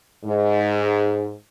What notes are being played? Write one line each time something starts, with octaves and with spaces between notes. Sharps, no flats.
G#2